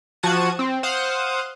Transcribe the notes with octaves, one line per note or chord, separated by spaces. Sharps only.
F3 F#4 F#5 A5 G#6 D#7
C4
C5 F5 F#5 D#6